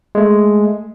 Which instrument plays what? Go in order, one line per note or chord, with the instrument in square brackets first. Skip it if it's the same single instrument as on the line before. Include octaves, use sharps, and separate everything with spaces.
[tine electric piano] G#3 A3